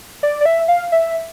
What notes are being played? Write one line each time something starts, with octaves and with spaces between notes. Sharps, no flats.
D5
D5
E5
F5
E5